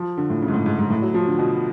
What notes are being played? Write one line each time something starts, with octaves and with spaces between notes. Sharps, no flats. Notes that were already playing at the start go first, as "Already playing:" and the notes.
Already playing: F3
D3
A2
C#3
G#2
A2
G#2
G#2
A2
F#3
F3
D3
B2